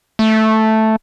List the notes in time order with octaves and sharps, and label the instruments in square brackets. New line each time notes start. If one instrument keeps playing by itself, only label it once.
[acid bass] A3